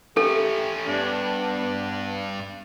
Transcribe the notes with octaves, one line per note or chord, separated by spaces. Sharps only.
A3 C#4 G4 A4
G2 B3 D4